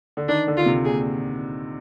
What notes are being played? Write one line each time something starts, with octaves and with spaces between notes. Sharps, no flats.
D3
D#3 D4
D3
F4
C3
A#2 G#4